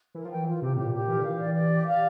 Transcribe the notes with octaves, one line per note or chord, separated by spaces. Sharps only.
E3 A#4
F3
E3 G5
F4
C3 G4
A2 G4
A#2
G4
E3 A#4
D3
E3 F5
D5
D5
G4
F5